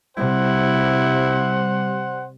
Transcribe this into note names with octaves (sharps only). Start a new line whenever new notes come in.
C3 G3 E4 C5 F#5